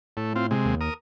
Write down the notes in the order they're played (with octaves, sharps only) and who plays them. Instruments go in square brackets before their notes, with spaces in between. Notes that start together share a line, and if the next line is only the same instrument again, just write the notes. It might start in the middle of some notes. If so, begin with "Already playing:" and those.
[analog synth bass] A2 [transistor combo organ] A3
[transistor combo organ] C4 F4
C3 G#3
[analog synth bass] D#2
[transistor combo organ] A#4 D#6